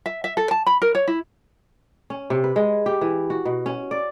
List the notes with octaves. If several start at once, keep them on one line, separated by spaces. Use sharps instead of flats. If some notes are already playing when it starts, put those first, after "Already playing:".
E5
E5
A4
A5
B5
A#4
C#5
E4
C#4
C3
B4
G#3
G4
E3
F#4
B2
C#4
D5